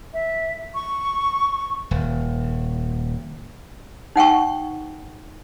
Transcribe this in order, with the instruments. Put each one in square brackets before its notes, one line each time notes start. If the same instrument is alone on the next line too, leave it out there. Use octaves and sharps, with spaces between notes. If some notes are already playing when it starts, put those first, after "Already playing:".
[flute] E5
C#6
[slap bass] D#1
[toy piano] D#4 F#5 G5 C#6